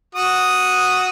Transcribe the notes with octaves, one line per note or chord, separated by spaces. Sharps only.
F#4 D#6